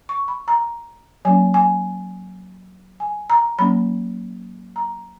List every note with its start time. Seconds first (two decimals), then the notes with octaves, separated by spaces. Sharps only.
0.09 C#6
0.28 B5
0.48 A#5
1.25 F#3 A#3 C#4 G#5
1.54 G#5
3.00 G#5
3.30 A#5
3.59 F#3 A#3 C#4 B5
4.76 A#5